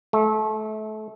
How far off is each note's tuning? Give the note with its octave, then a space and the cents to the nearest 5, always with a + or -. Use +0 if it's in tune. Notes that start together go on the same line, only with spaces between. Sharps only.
A3 -30